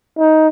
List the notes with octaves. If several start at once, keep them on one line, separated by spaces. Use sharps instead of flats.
D#4